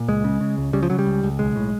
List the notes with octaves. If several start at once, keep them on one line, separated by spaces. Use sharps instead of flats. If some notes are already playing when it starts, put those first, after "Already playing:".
Already playing: A#2
C#2 G#3
C#3
C#3
C#2
C#3 G3
F3
C#3 F#3
G3
C#2
C#2
B1 G#3
A2